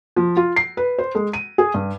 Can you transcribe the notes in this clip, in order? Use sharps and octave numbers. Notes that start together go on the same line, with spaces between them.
F3
F4
C7
B4
C5
G#3
D#7
G#4
G2